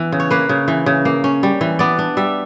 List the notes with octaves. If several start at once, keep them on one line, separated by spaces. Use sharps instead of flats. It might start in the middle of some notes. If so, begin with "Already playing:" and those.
Already playing: E3 B3
C#3
C#5
A#3 B4
C#3
E3
C#3
A#3
C#4
G3
E3
B3 D5
D4
G3 E5